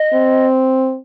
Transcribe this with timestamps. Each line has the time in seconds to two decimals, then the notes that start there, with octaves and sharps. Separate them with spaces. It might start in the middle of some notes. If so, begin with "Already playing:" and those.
Already playing: D#5
0.14 C4